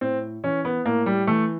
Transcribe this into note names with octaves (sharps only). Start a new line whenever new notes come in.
A2 C4
E3 C#4
B3
A2 A#3
G3
E3 A3